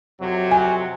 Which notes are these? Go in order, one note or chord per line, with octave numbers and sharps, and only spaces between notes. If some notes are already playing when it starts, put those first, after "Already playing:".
F2 C3 F#3
G#5